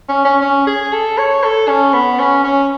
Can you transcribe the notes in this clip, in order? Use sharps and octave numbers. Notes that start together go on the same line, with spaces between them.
C#4
C#4
C#4
G#4
A4
C#5
A4
C#4
B3
C#4
C#4